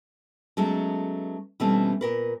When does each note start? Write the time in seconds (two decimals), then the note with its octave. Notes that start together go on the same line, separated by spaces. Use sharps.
0.57 F#3 G#3 A3 B3 C#4 D#4
1.60 B2 E3 G3 A3 C4 C#4
2.01 A#2 A#4 B4